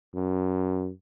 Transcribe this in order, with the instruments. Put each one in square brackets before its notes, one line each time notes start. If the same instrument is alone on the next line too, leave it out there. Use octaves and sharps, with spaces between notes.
[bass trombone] F#2